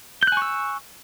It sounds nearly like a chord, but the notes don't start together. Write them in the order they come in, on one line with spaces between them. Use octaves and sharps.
G6 F#6 G#5 C#6 E6